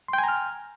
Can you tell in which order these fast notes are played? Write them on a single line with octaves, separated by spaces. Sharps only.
C6 G5 G#5 A#5 F6